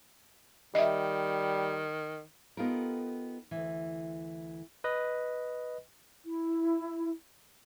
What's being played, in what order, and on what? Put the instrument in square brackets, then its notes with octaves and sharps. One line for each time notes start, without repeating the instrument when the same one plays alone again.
[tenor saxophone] D#3 [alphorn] G3 [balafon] D#5 E5
[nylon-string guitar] B3 D#4 F4 G4 A4 A#4
D2 E3
[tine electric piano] B4 D#5
[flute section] E4